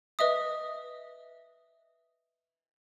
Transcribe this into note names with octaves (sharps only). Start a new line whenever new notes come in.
B4 D#5 E5 D#6